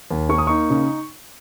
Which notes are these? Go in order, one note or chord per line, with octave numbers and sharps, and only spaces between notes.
D#2
A#3 C#6
D#6
D#4 C#6
C#3